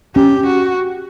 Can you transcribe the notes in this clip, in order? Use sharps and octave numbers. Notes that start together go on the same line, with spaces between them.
C#4 G4
F#4